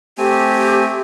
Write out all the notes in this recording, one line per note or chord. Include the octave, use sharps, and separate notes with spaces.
A3 C4 G4 G#5